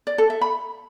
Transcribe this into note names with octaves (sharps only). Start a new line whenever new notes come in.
D5
A4
E5
B5